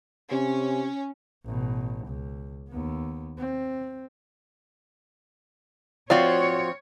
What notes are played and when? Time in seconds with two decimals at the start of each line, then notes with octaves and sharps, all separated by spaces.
0.31 C3 C#4
1.45 A1 B2
2.07 C#2
2.69 D#2 B3
3.38 C4
6.10 F3 C4 F4 F#4 C#5 D5